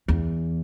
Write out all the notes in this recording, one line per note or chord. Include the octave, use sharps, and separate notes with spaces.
E2